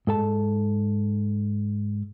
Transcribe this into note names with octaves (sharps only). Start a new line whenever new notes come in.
G#2 A4 A5